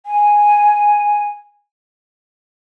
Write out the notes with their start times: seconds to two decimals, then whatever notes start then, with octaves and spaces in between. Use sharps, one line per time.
0.06 G#5